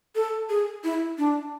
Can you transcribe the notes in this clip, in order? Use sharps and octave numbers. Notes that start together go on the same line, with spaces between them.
A4
G#4
E4
D4